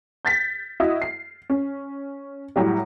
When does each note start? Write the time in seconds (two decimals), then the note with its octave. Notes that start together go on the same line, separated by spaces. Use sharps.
0.25 G6 A6 B6
0.80 E4 F#4 D#5 E5 D#6
1.02 C7
1.50 C#4
2.56 A2 F#3 G3